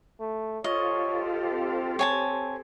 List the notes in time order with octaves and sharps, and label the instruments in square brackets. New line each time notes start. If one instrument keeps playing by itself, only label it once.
[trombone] A3
[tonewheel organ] F4 [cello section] G4 A4 C5 [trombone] C#5 [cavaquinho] D#5
[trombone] C4
[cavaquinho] C#5 G#5 A5